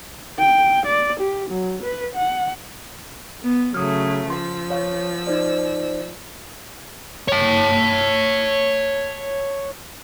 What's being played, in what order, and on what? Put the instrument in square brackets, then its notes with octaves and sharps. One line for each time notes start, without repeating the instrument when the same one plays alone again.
[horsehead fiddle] G5
D5
G4
F#3
B4
F#5
[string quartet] B3
[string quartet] C#3 F#3 A3 [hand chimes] D#6 F6
[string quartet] F3 E6 [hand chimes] C6
[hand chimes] C#5 F5
D#4 C5 D5
[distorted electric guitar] C#5 A5